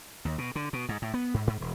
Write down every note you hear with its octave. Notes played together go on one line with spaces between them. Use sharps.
D#2
B2
D3
B2
G#2
A2
B3
G#2
G#2
E1